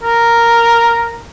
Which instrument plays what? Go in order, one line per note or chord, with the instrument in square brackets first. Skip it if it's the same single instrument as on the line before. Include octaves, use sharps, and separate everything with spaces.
[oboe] A#4